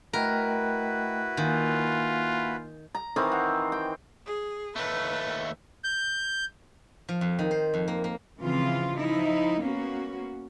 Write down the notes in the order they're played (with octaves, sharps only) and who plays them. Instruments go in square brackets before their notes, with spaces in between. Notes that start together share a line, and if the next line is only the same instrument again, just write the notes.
[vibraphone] A3 D#5 G5 [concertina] E4 F#4 B4 [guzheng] A#4
[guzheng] D#3 [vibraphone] A#3 F5 G#5 [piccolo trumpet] F4
[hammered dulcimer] A#5
D#3 E3 C4
F#5
G5
[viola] G#4
[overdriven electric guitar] D#2 A3 [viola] B4
[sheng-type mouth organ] G6
[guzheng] F3
F2
D#3
C5
F2
A#3
A#3
[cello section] C#3 E3 F3 C4 F4
F3 D#4 E4
A#3 B3 C#4 F#4